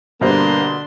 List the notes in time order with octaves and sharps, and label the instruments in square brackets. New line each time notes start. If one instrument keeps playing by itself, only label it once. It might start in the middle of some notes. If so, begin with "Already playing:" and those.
[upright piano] G2 C5 [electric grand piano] B2 D3 [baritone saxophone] A#3 [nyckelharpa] D4 C6